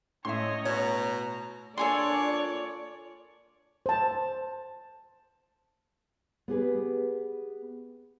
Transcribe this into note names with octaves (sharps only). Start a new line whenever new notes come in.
A2 A3 C#4 C#5 D#5 E5 C6
B2 C#5 A#5
A#3 D4 F4 A4 C#5 D5 G#5 C6
C5 A5
B3 G4 G#4 B4